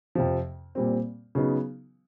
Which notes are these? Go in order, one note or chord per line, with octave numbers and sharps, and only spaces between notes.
F2 C3 F3
A#2 G3 C4
C#3 F#3 B3 D#4